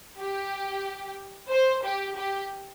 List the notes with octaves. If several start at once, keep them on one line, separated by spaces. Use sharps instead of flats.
G4
C5
G4
G4